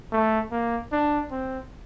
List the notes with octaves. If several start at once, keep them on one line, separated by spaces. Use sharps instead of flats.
A3
A#3
D4
C4